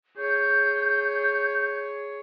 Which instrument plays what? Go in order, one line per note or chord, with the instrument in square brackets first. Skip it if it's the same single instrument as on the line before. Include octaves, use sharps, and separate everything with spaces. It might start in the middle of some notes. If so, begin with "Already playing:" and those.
[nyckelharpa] G#4 C#5 [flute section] G6